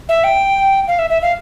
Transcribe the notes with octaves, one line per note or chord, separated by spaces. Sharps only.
E5
G5
F5
E5
E5
F5